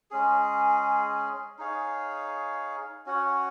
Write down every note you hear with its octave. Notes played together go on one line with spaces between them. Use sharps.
G#3 C#4 G#4
D#4 G#4 C#5 F5
C#4 F#4 C#5 F#5